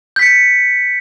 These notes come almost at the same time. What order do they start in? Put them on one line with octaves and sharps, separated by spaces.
G6 B6 C#7